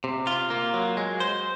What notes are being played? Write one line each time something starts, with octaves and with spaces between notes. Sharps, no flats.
C3
F4
A#3
F#3
G#3
C5